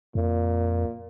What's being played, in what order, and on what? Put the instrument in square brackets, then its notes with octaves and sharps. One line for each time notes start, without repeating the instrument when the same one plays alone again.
[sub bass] F2 [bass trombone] A#2